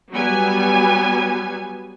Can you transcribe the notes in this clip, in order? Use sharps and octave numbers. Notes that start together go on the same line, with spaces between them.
F#3 G3 B3 G#5